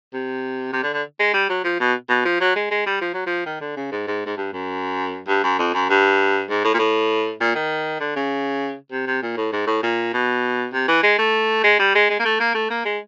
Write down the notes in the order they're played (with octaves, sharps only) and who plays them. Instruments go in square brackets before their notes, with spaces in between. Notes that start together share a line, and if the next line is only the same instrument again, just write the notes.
[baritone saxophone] C3
C3
D3
D3
G#3
G3
F#3
F3
B2
B2
F3
F#3
G#3
G#3
G3
F3
F#3
F3
D#3
D3
C#3
G#2
G#2
G#2
G2
F#2
G2
F#2
F2
F#2
G2
G#2
A2
A#2
A2
A#2
D#3
D3
C#3
C3
C3
A#2
A2
G#2
A2
A#2
B2
C3
E3
G#3
A3
G#3
G3
G#3
G#3
A#3
A3
A#3
A3
A#3
G#3